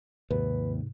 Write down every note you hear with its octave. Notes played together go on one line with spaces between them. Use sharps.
D#2 G#2 C3 B4